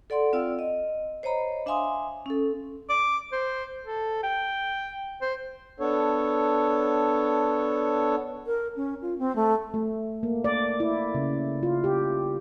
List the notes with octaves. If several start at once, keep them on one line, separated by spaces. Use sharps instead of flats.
A4 D5 F#5 C6
C4 F4 D5 F5 G5 E6
D#5
C5 C#5 D#5 A#5 B5
D4 E5 F5 G#5 C6 D#6
C#4 A4
D6
C5
A4
G5
C5
B3 D4 A4 C#5
A#4
C#4
F4
C4
A3
A3
A#3
D5
E4
C#3
F4
G4